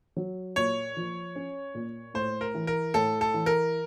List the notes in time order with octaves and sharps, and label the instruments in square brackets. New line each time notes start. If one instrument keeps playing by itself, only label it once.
[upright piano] F#3
[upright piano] A#2 [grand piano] C#5
[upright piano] F3
C#4
A#2
[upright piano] A2 [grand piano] C5
[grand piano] A#4
[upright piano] E3
[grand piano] A#4
[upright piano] A2 [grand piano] A4
[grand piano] A4
[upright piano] E3
[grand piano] A#4